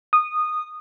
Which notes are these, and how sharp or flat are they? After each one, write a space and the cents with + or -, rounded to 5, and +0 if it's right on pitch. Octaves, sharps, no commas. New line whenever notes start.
D#6 -15